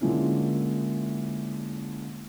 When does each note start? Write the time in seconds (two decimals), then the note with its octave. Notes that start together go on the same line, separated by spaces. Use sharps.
0.01 D3 G#3 A#3 C#4 E4 F4